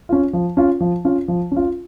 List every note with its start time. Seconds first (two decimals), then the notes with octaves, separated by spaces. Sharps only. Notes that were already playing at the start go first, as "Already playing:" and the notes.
0.09 C#4 F4
0.33 F3
0.57 C#4 F4
0.81 F3
1.05 C#4 F4
1.28 F3
1.52 C#4 F4